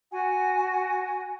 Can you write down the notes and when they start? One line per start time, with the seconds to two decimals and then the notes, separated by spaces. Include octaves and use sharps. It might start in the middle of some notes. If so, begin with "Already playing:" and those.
0.12 F#4 F#5 G#5